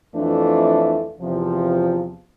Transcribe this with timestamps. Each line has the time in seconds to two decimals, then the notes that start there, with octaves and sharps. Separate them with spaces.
0.14 F2 E3 A3 D4 F4
1.20 E2 C3 F3